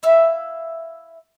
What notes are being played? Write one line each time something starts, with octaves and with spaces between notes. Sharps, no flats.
E4 E5 F5